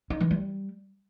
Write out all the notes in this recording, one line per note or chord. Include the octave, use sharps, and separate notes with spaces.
D#4
E3
G3